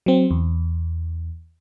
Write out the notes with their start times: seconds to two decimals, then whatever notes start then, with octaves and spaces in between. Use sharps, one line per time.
0.06 F#3 C4
0.31 E2